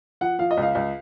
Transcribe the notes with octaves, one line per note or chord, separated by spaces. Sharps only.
F3 F#5
F3 F5
D#5
C#2 F5
C#2